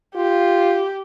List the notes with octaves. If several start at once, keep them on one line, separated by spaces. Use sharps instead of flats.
F4 G4